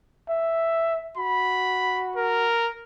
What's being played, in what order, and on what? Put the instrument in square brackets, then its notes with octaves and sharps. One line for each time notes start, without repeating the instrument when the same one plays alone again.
[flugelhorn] E5
[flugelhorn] F#4 [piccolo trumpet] B5
[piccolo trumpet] A#4